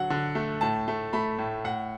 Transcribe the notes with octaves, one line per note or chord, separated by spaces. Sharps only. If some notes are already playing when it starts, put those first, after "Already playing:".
Already playing: D3 F#3 F#5
D3
A3
A2 A5
A3
A3 B5
A2
A2 F#5